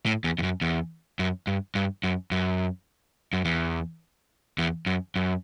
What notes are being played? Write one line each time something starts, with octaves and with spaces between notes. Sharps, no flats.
A2
E2
E2
F#2
E2
F#2
G2
G2
F#2
F#2
F#2
E2
E2
F#2
F#2